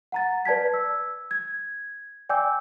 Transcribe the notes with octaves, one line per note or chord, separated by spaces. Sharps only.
F#5 A#5 A6
B4 D5 A5 G#6 B6
E6
G#6
D5 G5 G#5 D6 E6 G6